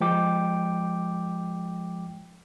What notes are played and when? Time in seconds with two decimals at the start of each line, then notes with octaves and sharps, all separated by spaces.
0.01 F3 G#3 G5 D6